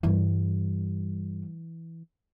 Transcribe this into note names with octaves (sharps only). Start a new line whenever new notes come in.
G2 E3 G3